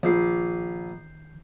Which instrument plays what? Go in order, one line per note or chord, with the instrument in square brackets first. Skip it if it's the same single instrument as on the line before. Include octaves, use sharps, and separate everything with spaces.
[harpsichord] A#1 [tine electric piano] D#3 G6 C7